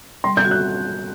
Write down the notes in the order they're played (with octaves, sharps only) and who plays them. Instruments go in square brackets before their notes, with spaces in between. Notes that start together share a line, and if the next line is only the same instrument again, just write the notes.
[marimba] G3 [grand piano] C6
[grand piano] G6
[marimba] F#4
[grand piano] F#6